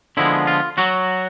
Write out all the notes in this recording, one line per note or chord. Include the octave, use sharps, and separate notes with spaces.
D3 F3 G#3 B3 E4
F4
F#3 F#4